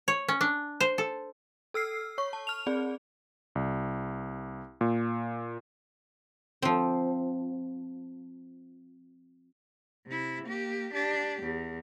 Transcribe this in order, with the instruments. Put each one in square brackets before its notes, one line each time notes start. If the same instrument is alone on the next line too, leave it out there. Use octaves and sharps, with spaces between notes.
[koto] C#5
C#4
D4
C5
A4
[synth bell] A4 E6 F6 C7
C#5 C#6
A5
F6 F7
C4 G#4 D5
[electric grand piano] C2
A#2
[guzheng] F3 C4
[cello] C3 E4
A#3 G4
D4 G4
E2